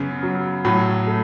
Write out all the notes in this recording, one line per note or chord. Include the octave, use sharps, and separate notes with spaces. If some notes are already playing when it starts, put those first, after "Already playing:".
Already playing: F#2 C#3 B3
F#3
A2 F#3
A3